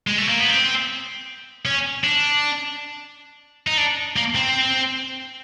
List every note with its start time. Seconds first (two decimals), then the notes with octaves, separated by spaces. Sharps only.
0.07 G#3
0.18 A3
0.28 A#3
0.39 B3
0.50 C4
1.66 C#4
2.04 D4
3.67 D#4
3.78 D4
4.16 A#3
4.35 C4